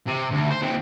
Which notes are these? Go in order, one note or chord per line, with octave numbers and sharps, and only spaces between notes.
C3
D2
C5
D#2 C4